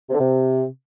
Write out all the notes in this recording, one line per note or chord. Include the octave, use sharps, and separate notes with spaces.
C3
D3
C3